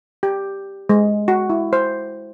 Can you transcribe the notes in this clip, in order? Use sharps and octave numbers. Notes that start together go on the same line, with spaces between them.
G4
G#3
F#4
E4
C5